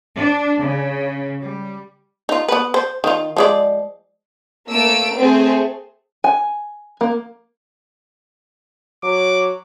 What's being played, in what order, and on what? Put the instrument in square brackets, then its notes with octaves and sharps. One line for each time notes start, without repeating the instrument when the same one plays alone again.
[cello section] D4
C#3
G3
[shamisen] D#4 F4
B3 B4
C5
D#3 F4
F3 G#3 D5
[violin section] A3 A#3 E6 D7
A3 C4 G#4
[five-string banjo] G#5
A#3
[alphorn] F#3 [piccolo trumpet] D6